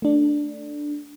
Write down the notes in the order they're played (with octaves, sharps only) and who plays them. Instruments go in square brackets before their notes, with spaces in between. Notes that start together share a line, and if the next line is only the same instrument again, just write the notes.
[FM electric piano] A3 D4